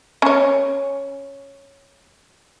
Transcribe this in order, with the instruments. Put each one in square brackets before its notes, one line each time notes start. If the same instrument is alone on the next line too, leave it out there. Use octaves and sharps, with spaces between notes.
[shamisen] C#4 C#5